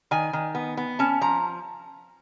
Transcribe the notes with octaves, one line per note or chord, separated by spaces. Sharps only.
D#3 G#5
D#3
B3
B3
C#4 A5
F3 A#5